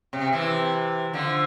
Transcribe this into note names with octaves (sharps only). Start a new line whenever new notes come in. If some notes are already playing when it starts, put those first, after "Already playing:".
C3
C3 E3
D3 F3